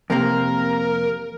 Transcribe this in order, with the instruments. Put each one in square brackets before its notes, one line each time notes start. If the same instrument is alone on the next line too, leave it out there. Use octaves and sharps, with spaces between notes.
[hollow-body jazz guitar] F2 C3 A#3 [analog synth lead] A#4